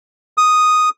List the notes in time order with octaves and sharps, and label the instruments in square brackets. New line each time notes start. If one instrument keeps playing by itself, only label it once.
[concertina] D#6